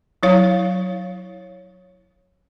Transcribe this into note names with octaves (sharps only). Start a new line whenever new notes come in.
F#3 E4 C#5 F5